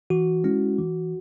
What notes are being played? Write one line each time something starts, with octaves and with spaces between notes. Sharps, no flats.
E3 F#4
G#3 C#4 E4
E3